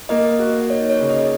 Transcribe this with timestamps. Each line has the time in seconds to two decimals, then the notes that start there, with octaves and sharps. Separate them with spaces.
0.09 A#3 D#5
0.39 F#4
0.69 D#4 C#5
0.90 C#5
1.00 C#3
1.10 D#5